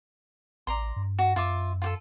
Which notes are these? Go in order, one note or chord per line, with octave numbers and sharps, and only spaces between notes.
A1 D5 A#5 C6
G2
F#4
F#2 F4 E5 D6
F4 G4 A4